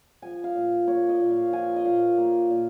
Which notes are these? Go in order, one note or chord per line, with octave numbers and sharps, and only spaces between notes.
F3 G#5
F5
A#2
A#3 C#5
D#5
A#2
F5
F3 G#5
D#5
A#2 F5
A#3
A#2